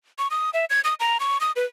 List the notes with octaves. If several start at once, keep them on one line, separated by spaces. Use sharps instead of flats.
C#6
D#6
E5
G#6
D#6
A#5
C#6
D#6
B4